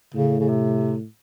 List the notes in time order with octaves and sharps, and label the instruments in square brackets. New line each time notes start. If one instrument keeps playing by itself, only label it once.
[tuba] A2 [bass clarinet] C#3
[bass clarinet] C#3
C3